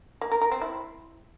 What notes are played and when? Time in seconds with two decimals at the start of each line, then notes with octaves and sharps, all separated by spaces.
0.21 A#3
0.31 A#4
0.41 A#4
0.51 C4
0.61 E4